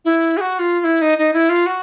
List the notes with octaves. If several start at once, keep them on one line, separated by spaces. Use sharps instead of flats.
E4
G#4
F#4
F4
F4
E4
D#4
D#4
E4
F4
F#4